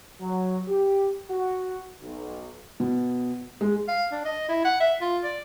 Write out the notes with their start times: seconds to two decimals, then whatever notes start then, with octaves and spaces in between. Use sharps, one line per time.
0.21 F#3
0.68 G4
1.30 F#4
2.02 B1
2.80 B2
3.61 G#3
3.88 F5
4.12 D4
4.25 D#5
4.49 E4
4.65 F#5
4.80 E5
5.01 F4
5.24 D5